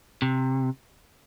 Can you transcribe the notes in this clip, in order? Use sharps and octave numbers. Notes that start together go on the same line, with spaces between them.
C3